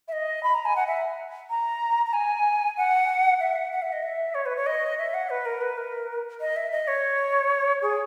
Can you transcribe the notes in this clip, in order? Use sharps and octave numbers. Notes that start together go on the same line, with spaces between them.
E5
D#5
B5
A#5
G#5
F#5
E5
A#5
A#5
G#5
F#5
E5
F#5
F#5
E5
D#5
E5
C#5
B4
C#5
D#5
E5
F#5
B4
A#4
B4
A#4
D#5
E5
D#5
C#5
G#4